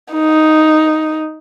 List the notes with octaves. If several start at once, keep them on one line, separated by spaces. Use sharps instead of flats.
D#4